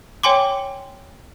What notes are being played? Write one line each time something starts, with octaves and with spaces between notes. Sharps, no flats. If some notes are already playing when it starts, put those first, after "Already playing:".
C#5 G5 G#5 C6 D6